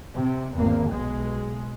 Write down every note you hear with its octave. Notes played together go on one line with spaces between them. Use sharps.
C3
G#1 E2 A#3
B1 B2 G#3